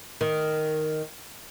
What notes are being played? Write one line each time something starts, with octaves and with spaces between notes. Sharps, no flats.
D#3